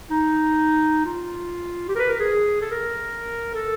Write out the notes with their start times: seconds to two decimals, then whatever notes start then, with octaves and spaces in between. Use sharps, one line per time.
0.11 D#4
1.05 F4
1.89 G4
1.95 A#4
1.99 B4
2.09 A#4
2.20 G#4
2.61 A4
2.71 A#4
3.55 A4